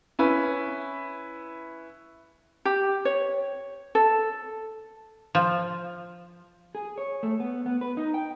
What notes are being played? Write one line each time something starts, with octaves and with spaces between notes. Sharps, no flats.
C#4 E4 B4
G4
C#5
A4
F3
G#4
C#5
A3
B3
B3
B4
D#4
G5